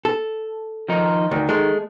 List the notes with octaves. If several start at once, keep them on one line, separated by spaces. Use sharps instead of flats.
A4
D#3 F3 D#4
D2 D#3
G#3 A3